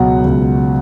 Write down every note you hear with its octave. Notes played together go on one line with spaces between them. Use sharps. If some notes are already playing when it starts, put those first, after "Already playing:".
Already playing: C#2 B2 F#3 F#5
C#2